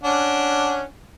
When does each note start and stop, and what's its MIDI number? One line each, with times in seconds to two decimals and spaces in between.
0.03 0.83 61
0.03 0.83 62
0.03 0.83 78